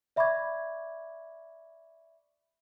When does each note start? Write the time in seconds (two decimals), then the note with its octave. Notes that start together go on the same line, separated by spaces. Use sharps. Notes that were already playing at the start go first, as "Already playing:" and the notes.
0.16 D5 E5 B5 C#6 D6 G#6